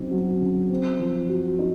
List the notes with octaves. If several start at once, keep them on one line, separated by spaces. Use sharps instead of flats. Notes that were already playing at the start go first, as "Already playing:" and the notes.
Already playing: C#3 F#3 C4 D#4
F#3
C#3
C4
F3
F#4
D#4